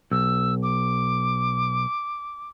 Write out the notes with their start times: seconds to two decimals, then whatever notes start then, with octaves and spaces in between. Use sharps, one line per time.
0.11 B1 E6
0.63 D6